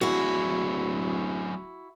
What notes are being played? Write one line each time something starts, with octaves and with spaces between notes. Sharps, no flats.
D1 F#3 D4 E4 F#4 G#4